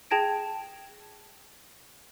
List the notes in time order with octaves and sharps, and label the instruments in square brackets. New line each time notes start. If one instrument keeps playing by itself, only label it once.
[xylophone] G#4 G5 A5 G#6 A#6 D7